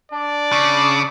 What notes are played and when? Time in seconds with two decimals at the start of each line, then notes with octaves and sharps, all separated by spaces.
0.12 D4 D5
0.52 C#3